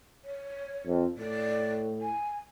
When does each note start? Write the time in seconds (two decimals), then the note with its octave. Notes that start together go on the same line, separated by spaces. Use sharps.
0.24 C#5
0.87 F2
1.18 A2 D5
2.01 G#5